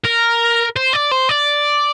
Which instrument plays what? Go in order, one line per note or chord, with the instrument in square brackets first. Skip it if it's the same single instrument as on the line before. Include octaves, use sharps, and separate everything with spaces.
[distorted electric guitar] A#4
C5
D5
C5
D5